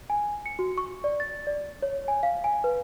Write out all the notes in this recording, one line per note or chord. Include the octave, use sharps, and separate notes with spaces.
G#5
C#7
F#4
C#6
D5
A6
D5
C#5
G#5
F5
G#5
B4